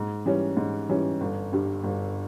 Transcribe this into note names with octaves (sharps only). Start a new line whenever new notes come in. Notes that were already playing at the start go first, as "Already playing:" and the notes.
Already playing: G#2
E3 G3 C#4
G#2
E3 G3 C#4
G1
G2 G3
G1